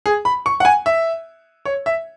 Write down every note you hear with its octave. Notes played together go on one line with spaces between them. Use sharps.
G#4
B5
C#6
F#5
G#5
E5
C#5
E5